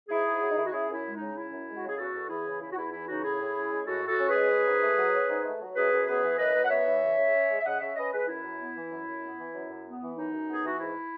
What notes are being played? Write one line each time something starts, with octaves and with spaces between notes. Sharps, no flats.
G#2 E4 G#4
G#2
F#3
D#4
D#3 E4
F#4
C#4 E4 G#4
F#2
E4
G#3
D#4
C#3
C#4 E4
F#2
G#3
C#3 F#4
G#4
E2 F#4 A4
E2
E3 E4 G#4
C#3
E2 E4
F#4
E2 E4
E3 E4
C#3 D#4 F#4
A2 E4 G#4
A2
C#4
G#3
A2 F#4 A4
A2
F#4 A4
C#4
G#4 B4
G#3
C#4
G#2
A3
F#3
C#4
G#2
A3
F#3
F#2 G#4 B4
F#2
B3 G#4 B4
E3
F#2 B4 D#5
F#2
F#5
B3 C#5 E5
E3
C#3
C#3
C#4
G#3
E5
C#3 D#5 F#5
C#3 C#5 E5
C#4 B4 D#5
G#3 G#4 B4
F#2 E4
F#2
B3
E3
F#2
F#2
B3
E3
F#2
F#2
B3
E3
F#2 D#4
F#2
B3 G#4
E3 F#4
G#2 E4